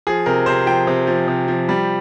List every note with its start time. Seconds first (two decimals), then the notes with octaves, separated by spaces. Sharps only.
0.07 F3 G#4
0.26 C3 A#4
0.46 C3 C5
0.66 F3 G5
0.87 C3
1.07 F3
1.28 C3
1.48 F3
1.69 G3